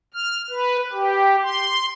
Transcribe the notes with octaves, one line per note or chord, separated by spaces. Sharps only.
F6
B4
G4
C6